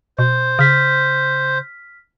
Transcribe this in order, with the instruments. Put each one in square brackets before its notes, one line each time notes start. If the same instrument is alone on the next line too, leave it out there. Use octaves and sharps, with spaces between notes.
[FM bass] B2 [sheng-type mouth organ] C5
[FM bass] C#3 [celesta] F6 B6